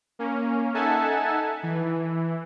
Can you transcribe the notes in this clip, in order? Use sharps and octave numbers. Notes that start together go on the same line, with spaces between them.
A#3 C#4
D#4 A4 E5 F#5 G#5 A5
E3